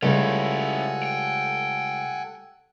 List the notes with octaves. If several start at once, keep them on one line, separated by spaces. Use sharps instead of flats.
C#2 G3 A3 C#4 E4 A4 F#5 G#5
G5